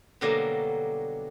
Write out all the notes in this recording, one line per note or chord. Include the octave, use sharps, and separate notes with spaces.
B2 D3 F#3 G3 A#3